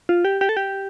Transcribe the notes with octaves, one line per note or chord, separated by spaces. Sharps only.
F4
G4
G4
A4
G4